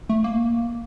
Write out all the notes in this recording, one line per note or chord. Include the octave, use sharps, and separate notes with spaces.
A3
A#3